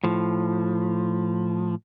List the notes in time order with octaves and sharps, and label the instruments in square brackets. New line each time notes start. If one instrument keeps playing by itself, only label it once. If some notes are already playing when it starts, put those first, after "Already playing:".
[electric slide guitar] A2 F3